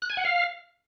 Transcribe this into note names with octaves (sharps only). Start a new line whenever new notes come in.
F#6
G#5
F#5
F5